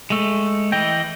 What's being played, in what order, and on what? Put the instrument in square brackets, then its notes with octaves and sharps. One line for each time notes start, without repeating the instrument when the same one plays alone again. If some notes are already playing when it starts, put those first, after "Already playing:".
[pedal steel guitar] G#3 A3
E3 D#5 G5